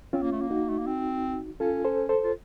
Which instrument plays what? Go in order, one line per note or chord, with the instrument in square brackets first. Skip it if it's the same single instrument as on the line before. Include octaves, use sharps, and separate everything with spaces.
[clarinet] C4 [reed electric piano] C#4 F4
[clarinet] A#3
A3
A#3
[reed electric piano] D#4 F#4
[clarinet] A3
A#3
C4
[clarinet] C#4 [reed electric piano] F4 A4
[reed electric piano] A4 C5
A4 C5
[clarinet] F4